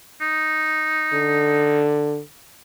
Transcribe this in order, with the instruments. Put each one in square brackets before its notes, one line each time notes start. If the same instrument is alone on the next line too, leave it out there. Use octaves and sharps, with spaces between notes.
[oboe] D#4
[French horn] D3